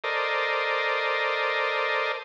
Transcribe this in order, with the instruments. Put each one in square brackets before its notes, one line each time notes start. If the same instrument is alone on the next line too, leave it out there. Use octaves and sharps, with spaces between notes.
[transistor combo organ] A4 A#4 C5 D5 D#5